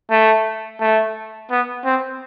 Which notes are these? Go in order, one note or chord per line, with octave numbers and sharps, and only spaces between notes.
A3
A3
B3
C4